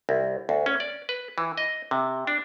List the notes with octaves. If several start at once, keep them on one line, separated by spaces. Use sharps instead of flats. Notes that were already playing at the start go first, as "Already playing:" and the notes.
C2
D2
C#4
D5
B4
E3
D#5
C3
D4